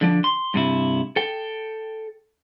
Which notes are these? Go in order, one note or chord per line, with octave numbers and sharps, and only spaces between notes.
D3 F3 D4
C6
G2 C3 E4
A4 G5